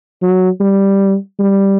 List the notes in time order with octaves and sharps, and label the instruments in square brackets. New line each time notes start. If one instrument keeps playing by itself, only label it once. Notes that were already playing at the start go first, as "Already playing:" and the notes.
[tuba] F#3
G3
G3